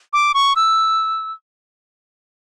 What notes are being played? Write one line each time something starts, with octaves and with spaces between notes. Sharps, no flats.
D6
C#6
E6